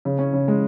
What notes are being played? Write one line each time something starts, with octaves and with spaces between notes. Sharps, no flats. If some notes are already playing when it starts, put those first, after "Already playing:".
C#3
C#4
C#3
G#3